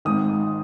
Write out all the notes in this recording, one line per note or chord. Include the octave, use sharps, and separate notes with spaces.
G#1 G#2 D#3 D#6